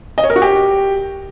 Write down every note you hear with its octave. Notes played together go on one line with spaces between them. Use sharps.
D#5
C#5
A#4
F#4
G4